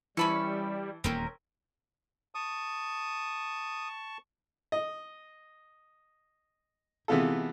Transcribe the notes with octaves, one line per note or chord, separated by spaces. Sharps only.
E3 G3 C#4 E4 A5 B5 C#6
D#1 E2 A#3 C4 C#4 A#4
A5 C#6 D#6
D#5
C3 E3 G#3 B3 F4 A4